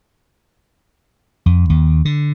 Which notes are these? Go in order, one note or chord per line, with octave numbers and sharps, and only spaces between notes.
F2
D#2
D3